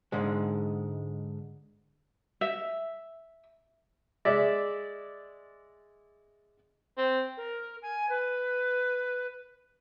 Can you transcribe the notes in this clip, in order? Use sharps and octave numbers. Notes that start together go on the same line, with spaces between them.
G#2 D3 G#3
E5
G#3 D5 E5
C4
A#4
G#5
B4